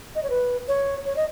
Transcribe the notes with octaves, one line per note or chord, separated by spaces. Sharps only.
D#5
C#5
B4
C#5
C#5
D#5